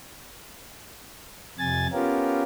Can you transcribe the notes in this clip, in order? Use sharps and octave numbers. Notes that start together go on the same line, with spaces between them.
F2 C3 G#5 A6
B3 C#4 F4 G4 A#4